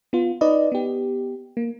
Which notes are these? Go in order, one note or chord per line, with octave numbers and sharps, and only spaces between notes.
B3 F4
D#4 B4 D5 D#5
B3 G4
A#3